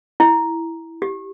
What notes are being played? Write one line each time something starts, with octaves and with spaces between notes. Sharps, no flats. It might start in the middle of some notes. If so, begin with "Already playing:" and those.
E4
G4